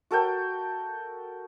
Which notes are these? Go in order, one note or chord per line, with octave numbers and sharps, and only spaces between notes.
F#4 A4 A#4 G5